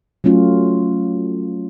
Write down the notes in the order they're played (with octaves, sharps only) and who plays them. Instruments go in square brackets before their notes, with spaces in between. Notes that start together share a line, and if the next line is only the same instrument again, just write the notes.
[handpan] F#3 A3 C#4 F4